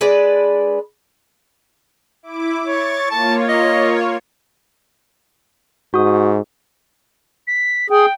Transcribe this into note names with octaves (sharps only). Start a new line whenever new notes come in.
G#3 D4 B4 D5
E4 D6
C#5 C#6 A6
A#3 F4 C#5 A5
D#5
G#2 F#4 D#6
B6
G#4 G5